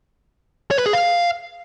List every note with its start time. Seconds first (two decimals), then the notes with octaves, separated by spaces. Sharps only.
0.71 C#5
0.78 B4
0.86 G#4
0.93 F5